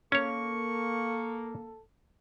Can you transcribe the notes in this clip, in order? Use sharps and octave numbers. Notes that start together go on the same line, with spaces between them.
A#3 C#4 A4 C#5 C#6